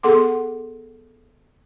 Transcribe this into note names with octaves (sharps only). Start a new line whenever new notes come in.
B3 G#4 A4 F#5 C6 D6